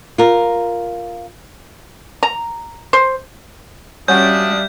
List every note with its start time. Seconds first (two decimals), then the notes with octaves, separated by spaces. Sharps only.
0.18 F4 A#4
2.23 A#5
2.93 C5
4.08 G3 C#4 D4 F#4 E5 F5 D#6 G6